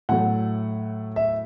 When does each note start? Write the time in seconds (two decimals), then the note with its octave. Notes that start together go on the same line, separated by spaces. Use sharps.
0.09 A2 F#3 A3 F#5
1.16 E5